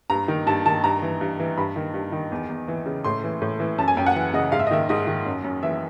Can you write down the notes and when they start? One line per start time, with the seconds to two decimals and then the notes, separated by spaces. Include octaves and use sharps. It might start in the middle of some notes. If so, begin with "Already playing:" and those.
0.10 G2 A#5
0.28 D#3
0.46 G2 A5
0.66 D#3 A5
0.84 G2 A#5
1.02 E3
1.21 G2
1.40 E3
1.58 G2 B5
1.76 D#3
1.94 G2
2.12 D#3
2.32 E2
2.49 E2
2.68 E3
2.86 C#3
3.04 A2 C6
3.24 E3
3.42 A2
3.60 E3
3.78 F#2 A5
3.88 G#5
3.97 F#2 G5
4.06 F#5
4.15 E3
4.34 C#3 D#5
4.52 G#2 F5
4.59 E5
4.67 D#5
4.71 D#3 E5
4.89 G#2 D#5
5.07 D#3
5.26 F#2
5.44 F#2
5.63 E3 E5